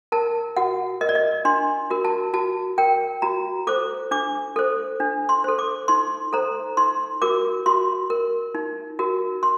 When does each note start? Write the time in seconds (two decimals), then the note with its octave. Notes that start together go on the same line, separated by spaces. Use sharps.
0.12 A#4 A5
0.56 F#4 F#5
1.01 A#4 D#5
1.09 D5
1.15 D#5
1.45 D4 C6
1.90 F#4 A#4
2.05 A5
2.34 F#4 A5
2.78 A#4 G5
3.22 F#4 A#5
3.67 A4 C5 D6
4.11 D4 D6
4.56 A4 C5
5.00 D4
5.29 C6
5.44 A4 C5
5.59 D6
5.88 D#4 C6
6.33 A4 C5 A#5
6.77 D#4 C6
7.22 F#4 A#4 D6
7.66 F#4 C6
8.10 A#4
8.55 D#4
8.99 F#4 A#4
9.43 C6